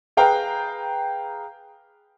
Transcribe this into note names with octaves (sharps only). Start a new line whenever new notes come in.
G#4 B4 F5 G5 A#5